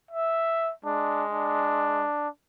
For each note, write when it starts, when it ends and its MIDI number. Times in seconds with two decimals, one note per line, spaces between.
0.11 0.71 76
0.85 2.06 56
0.85 1.24 62
1.30 2.29 62